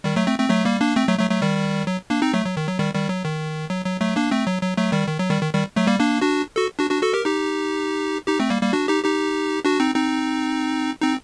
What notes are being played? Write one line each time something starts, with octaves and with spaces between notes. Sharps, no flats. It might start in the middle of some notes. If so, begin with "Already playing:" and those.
D#3 G3
F#3 A3
A3 C4
A3 C4
F#3 A3
G3 A#3
A#3 D4
A3 C4
F#3 A3
F#3 A3
F#3 A3
D#3 G3
F#3
A#3 D4
C4 D#4
F#3 A3
F#3
D#3
F#3
D#3 G3
D#3 G3
F#3
D#3
F#3
F#3
F#3 A3
A#3 D4
A3 C4
F#3
F#3
F#3 A3
D#3 G3
D#3
F#3
D#3 G3
D#3
D#3 G3
F#3 A3
G3 A#3
A#3 D4
D4 F#4
F#4 A4
D4 F#4
D4 F#4
F#4 A4
G4 A#4
D#4 G4
D#4 G4
A3 C4
G3 A#3
G3 A#3
D4 F#4
D#4 G4
D#4 G4
D4 F#4
C4 D#4
C4 D#4
C4 D#4